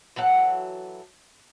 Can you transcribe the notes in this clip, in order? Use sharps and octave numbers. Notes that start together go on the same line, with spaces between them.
E3 F#3 A4 F#5